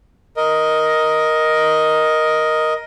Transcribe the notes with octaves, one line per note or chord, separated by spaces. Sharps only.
A#4 D#5